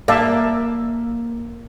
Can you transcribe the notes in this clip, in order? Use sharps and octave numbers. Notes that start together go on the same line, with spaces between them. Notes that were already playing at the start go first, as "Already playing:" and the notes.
A#3 D5 E5 A5